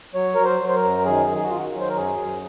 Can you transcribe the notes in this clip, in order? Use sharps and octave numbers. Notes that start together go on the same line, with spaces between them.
F#3 C#5
F#3 A#4
C5
F#3
C5
A#4
F#2
D#3 G#4
D#3
G#4
F#4
D#3 F4
F#4
F#3
C5
A#4
F#2 G#4
F#2